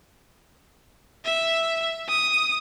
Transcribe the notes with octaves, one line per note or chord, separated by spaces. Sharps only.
E5
D#6